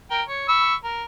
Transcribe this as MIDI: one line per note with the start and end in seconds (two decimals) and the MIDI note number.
0.11 0.22 70
0.11 0.22 79
0.27 0.47 73
0.48 0.74 83
0.48 0.74 85
0.48 0.74 88
0.84 1.04 70